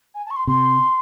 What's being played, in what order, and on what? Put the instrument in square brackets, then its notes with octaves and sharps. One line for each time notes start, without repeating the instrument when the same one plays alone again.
[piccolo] G#5
A5
C#6
C6
[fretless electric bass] C3 [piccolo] C6